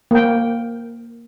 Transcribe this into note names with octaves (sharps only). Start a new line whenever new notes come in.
A#3 G5